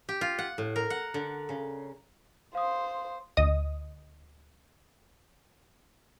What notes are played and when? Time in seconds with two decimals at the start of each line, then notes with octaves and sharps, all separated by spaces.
0.09 G4
0.21 F4
0.39 F#5
0.58 A2
0.76 A#4
0.90 F#5
1.14 D3
1.49 C#3
2.55 C5 F5 D#6
3.37 D2 D#5 D#6